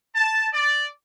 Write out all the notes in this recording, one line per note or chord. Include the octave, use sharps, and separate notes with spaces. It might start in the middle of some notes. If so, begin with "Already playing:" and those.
A5
D5